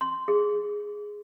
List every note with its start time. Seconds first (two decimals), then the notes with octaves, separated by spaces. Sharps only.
0.01 C6
0.28 G#4